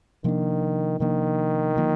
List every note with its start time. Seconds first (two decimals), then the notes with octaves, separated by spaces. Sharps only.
0.24 C3 D#3 F3 A#3 D4
1.00 C3 D#3 F3 A#3 D4
1.76 D3 F3 A#3